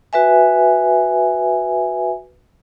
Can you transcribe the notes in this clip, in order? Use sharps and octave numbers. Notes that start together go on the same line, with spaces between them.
F#4 B4 E5 G#5